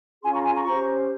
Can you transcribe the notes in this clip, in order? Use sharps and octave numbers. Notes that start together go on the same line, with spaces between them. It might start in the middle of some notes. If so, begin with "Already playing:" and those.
C#4 F4 G#4 G#5 C6
A#5 C#6
G#5 C6
A#5 C#6
C#4 G4 C5 A#5 C#6